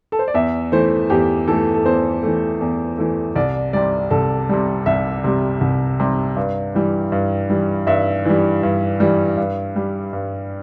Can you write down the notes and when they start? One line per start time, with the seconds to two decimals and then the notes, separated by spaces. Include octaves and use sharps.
0.12 A4
0.19 C5
0.28 D5
0.34 E2 E5
0.72 E3 A3 C5
1.10 E2 G4
1.47 E3 A3 A4
1.74 A4
1.85 E2 C5
2.23 E3 A3
2.61 E2
2.98 E3 A3
3.36 C2 D5
3.73 C3 G3 D5
4.11 C2 A4
4.49 C3 G3
4.86 C2 E5
5.24 C3 G3
5.61 C2
6.00 C3 G3
6.36 G2
6.75 E3 G3
7.12 G2
7.50 E3 G3
7.87 G2 E5
8.25 E3 G3
8.63 G2
9.00 E3 G3
9.37 G2
9.76 G3
10.13 G2